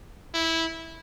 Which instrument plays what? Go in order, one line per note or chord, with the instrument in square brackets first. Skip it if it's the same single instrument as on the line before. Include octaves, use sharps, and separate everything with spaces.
[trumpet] E4